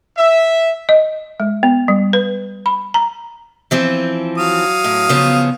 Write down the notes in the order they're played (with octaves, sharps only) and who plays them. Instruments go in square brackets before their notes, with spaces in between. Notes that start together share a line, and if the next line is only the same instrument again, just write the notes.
[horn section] E5
[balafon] D#5
G#3
B3
G3
B4
B5
A#5
[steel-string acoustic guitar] E3 F3 C4
[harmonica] F#3 F5 D#6
[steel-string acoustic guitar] A2
C#3 F3 B3